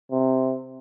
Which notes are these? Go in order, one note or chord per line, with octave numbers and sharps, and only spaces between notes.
C3